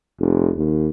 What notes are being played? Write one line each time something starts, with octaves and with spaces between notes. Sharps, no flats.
F1
D#2